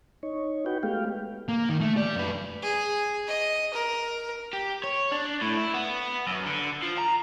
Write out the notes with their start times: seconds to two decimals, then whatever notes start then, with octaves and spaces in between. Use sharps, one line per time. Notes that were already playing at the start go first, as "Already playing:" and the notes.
0.23 D#4 C#5
0.66 D#4 F#4 B4 G5
0.83 G#3 A3 B3 G4 F5 G5
1.49 A#3
1.69 D#3
1.81 A3
1.96 G4 D5
2.16 F#2 B4
2.63 G#4
3.28 D#5
3.73 A#4
4.53 G4
4.84 C#5
5.12 D4
5.42 A2
5.58 E4
5.74 B3
6.27 F#2
6.46 D3
6.83 F3
6.98 A#5